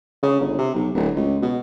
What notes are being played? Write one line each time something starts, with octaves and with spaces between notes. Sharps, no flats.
C#3
G1
C3
B1
D1
C#2
B2